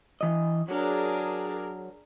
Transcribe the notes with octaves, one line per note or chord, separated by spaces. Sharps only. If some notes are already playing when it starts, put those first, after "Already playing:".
E3 D#5
F#3 D4 G#4 A#4